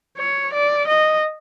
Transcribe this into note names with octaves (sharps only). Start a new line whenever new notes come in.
C#5
D5
D#5